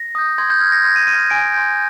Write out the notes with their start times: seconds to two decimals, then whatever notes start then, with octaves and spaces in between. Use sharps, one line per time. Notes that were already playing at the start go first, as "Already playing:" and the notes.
Already playing: A#6
0.15 D#6 G6
0.38 C6 G#6
0.50 G6
0.61 F6 G#6
0.72 A#6
0.84 C6 G#6
0.96 D#7
1.07 F6 D#7
1.20 D#7
1.30 G#5 D7
1.54 C6 G6